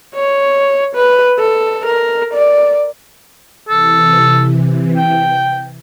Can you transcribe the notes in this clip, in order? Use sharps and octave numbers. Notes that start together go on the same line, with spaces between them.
C#5
B4
A4
A#4
D5
C3 E3 A4
G5